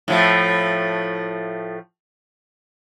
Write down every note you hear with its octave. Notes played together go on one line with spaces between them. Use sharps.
A2 F3 A3